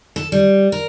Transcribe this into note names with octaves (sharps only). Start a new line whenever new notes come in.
A4
G3
A#4